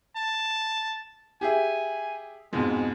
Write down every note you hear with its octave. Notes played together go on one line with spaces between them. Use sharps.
A5
G4 G#4 E5 G#5
F2 G#2 B2 G#3